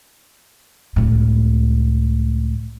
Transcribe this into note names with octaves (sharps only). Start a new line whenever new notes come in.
C#2 A2